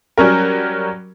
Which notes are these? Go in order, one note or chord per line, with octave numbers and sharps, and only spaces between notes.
F#3 G3 C#4 A#4